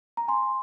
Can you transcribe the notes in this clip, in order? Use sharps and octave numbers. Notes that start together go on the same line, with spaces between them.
A#5
G#5 C6